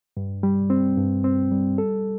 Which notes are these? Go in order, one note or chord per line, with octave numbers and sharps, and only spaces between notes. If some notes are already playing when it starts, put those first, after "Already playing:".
G2
G3
C4
G2
C4
G3
A4